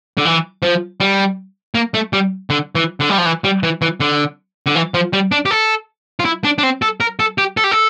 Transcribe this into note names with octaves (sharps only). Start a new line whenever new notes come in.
D3
E3
F3
G3
A#3
A3
G3
D3
E3
D3
G3
F3
E3
G3
E3
E3
D3
D3
E3
F3
G3
D4
G4
A4
F4
E4
D4
D4
C4
A4
A#4
A4
G4
A4
G4
A4